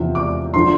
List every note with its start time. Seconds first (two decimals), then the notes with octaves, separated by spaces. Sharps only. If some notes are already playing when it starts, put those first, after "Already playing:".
Already playing: E2 C3 F3
0.15 D6
0.54 D3 F3 C6